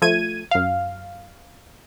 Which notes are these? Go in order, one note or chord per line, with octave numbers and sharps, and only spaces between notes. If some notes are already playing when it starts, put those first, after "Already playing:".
F3 A3 G#6 D#7
F#2 F5